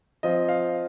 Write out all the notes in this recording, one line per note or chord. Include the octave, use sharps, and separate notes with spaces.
F3 C4 F4 D#5
F5